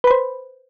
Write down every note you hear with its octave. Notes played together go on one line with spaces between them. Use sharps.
B4 C5 B5